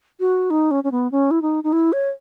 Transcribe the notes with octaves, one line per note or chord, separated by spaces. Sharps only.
F#4
D#4
C#4
C#4
B3
C#4
E4
D#4
D#4
E4
C#5